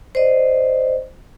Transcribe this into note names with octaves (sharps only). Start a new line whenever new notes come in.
C5 D5 D#5